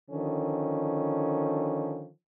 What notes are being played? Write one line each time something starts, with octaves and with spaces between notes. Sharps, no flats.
D3 D#3 F3 C#4